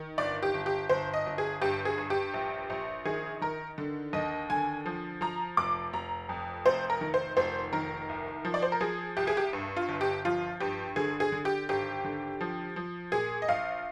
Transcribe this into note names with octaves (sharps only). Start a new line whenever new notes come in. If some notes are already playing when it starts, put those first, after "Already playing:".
Already playing: D#3
G1 D5
G4
G1
G4
G1 C5
D#5
G1
G#4
G2 G4
G#4
G2
G4
A#1
A#1
D#3 G#4
D#3 A#4
D3
D#2 D#5
D3 G#5
F3
F3 A#5
F1 D6
F1 A#5
F2
F1 C5
A#4
D#3
C5
F1 C5
D#3 A#4
C2
F3
D5
C5
A#4
F3 G#4
C2 G4
G#4
G4
G2
F4
G1
G4
F3 F4
G2 G4
D3 G#4
G#4
D3
G4
G#1 G4
D3
F3
F3
A#2 G#4
D#5
A#1 F5